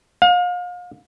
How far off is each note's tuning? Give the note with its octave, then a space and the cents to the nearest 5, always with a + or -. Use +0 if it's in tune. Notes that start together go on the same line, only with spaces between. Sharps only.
F5 +35